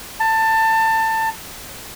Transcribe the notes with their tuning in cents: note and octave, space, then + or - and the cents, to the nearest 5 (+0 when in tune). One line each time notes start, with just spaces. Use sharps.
A5 +20